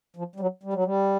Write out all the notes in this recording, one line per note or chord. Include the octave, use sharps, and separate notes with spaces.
F3
G3
F#3
G3
F#3
G3